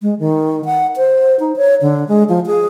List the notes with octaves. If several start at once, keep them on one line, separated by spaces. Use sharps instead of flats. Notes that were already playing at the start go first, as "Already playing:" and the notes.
G#3
D#3
F#5
C5
D#4
C#5
D3
G#3
F3
G#4